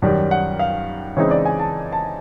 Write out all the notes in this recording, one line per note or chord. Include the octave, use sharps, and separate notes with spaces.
F#2 D#3 G3
F#5
F5
C#3 E3 G#3 C4 D#4 C#5
D5
G#5
A5
A5